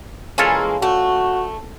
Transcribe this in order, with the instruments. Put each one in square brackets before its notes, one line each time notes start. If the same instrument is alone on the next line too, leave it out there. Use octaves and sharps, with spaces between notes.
[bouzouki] E3 G#3 A#3 [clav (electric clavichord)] C#4 F4 A4
[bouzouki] A3 [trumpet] F#4